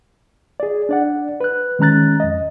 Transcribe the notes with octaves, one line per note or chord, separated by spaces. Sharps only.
G#4 D5
D4 D5 F#5
B4 F#6
D#3 G#3 C#4 A#5 F#6 A6
F2 D#5